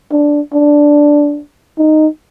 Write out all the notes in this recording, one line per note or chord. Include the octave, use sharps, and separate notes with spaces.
D4
D4
D#4